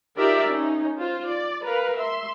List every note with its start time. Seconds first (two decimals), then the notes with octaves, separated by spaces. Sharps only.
0.17 D#4 F4 G4 A#4 D5 E5
0.50 C#4 D#4
0.98 F4 C5
1.27 D5
1.64 A#4 B4 F5
1.98 E5 C6